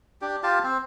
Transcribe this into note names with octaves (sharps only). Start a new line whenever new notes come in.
D4 G4
F4 G4 F5 A5
C4 C5